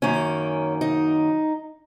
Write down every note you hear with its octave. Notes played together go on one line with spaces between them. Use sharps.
F#2 D#3 A#3 C#4
D#4